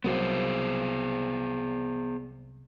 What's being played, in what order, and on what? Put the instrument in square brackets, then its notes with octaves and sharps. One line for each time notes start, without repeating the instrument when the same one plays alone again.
[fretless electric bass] C2 F#3 A#3 [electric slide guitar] B3 G#4 C5